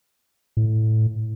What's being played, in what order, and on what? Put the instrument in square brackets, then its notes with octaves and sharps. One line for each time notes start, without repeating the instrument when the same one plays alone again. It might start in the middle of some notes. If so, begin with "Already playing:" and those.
[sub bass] A2